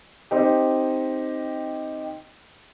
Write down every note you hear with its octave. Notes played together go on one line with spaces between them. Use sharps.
C4 D#4 G4